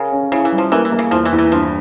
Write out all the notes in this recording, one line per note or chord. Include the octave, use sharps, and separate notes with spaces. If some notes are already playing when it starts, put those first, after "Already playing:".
Already playing: C#3 A#4
C#4
C#3 E4
E3
G3
F3
E3 A#3
E3
A#3
C#3
E2 F3
E3
E2
E3
G2 F3